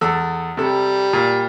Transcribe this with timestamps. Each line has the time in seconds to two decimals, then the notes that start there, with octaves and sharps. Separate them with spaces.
0.01 E2 A4 E6
0.57 C3 G3 A4
1.13 A#2